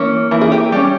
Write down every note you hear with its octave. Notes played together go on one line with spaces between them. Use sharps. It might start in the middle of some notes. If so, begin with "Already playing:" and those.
Already playing: E3 A#3 C#4
E3 A#3
G#4
G4
G3 C#4 G4